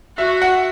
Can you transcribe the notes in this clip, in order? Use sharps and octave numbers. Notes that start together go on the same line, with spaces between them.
F#4 E5
F#5